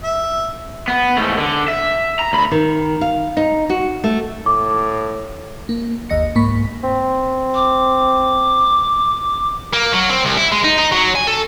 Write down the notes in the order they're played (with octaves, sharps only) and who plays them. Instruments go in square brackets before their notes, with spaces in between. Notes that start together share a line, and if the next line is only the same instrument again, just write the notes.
[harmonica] E5
[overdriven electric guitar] B3
G#2 A3
D3
E5
A#5
D2 B5
[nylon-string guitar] D#3
F5
D#4
F#4
A3
[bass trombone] A2 [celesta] D6
[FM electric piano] A#3
G1 D#2 D#5 A#6 C#7
C2 G#2 A#3 B5 C#6 B6
[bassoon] C4
[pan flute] D6
[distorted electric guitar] A#3
F#3
C4
C2
E4
G#3
D#4
D#4
F#3
G#5
A4